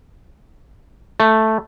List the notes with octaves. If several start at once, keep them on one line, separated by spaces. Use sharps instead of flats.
A3